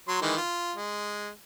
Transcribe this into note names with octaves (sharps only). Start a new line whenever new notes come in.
F#3 C6
D#3 E3 G#3
F4
G#3